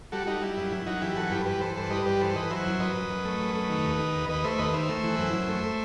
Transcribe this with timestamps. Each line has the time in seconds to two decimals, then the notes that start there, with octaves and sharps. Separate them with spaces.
0.12 G3 F#4 A4
0.26 G3 D#4 F#4
0.42 G3 E4
0.57 F#2 E4
0.72 F#2 E4
0.86 F#2 D#4 F#4
1.01 E3 E4 G4
1.16 F#2 F#4 A4
1.31 G2 G4 B4
1.46 E3 G4 B4
1.61 E3 A4 C5
1.76 G2 A4 C5
1.90 G3 B4 D#5
2.06 G2 G4 B4
2.21 E3 A4 C5
2.36 E3 B4 D#5
2.51 F#3 C5 E5
2.66 F#2
2.80 F#2 B4 D#5
2.96 F#2
3.09 F#2
3.25 A3
3.40 F#2
3.55 A3
3.69 D#3
3.85 D#2
3.99 D#3
4.15 D#2
4.29 D#2 B4 D#5
4.44 A3 C5 E5
4.58 D#2 B4 D#5
4.74 D#3 C5 E5
4.89 A3
5.04 E3
5.18 F#2
5.33 F#2
5.49 A3
5.64 A3